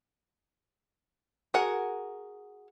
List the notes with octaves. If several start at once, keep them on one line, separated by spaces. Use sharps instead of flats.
F#4 G#4 A#4 F#5